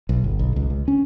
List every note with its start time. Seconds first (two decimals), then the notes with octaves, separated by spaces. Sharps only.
0.09 B1
0.24 G1
0.39 B1
0.56 C#2
0.70 C#2
0.88 C#4